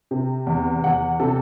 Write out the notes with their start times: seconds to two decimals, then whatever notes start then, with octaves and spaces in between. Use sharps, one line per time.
0.11 C3
0.47 E2
0.84 E2 F#5
1.20 C3 A4